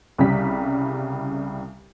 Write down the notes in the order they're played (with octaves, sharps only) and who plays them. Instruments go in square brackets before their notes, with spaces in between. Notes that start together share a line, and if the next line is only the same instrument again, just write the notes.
[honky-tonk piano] C2 C#3 G3 B6